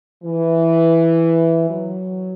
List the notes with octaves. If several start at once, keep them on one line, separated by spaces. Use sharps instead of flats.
E3
F#3